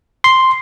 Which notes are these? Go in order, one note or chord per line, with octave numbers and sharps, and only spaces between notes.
C6